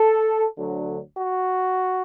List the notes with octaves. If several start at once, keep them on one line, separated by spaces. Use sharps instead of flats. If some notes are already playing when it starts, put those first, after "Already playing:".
Already playing: A4
D2 D3 F#3
F#4